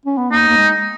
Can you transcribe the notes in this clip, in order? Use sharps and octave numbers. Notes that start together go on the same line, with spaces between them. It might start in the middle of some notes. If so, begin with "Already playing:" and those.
C#4
B3
A#3 D#4
A#3
G#3